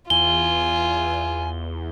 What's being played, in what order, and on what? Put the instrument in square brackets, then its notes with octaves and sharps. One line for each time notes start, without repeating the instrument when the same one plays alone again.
[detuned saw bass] E2 [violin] F4 [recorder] G#5 [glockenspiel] G7